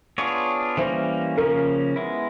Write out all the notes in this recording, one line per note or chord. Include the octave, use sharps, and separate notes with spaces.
B3 D4 F4 G#4 C#5
E3 G3 A#3 C#4 C5
C#3 F3 A#3 C#4 A#4
G#3 B3 E4